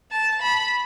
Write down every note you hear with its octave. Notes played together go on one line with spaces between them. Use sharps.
A5
B5